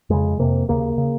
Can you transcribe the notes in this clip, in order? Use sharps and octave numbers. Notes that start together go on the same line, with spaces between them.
F2 C#3 G#3
F2 C3 A#3
D#2 C#3 A#3
C#3